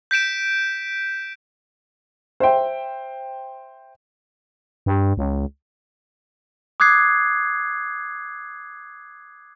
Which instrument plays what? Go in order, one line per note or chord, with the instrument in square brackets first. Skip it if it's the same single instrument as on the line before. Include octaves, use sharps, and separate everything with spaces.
[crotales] G6 B6 D7 E7
[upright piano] C5 E5 G5
[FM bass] G2
C#2
[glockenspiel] D6 D#6 F#6 G#6 C7